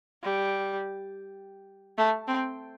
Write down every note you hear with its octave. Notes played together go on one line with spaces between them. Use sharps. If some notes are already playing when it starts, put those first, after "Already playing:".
G3
A3
C4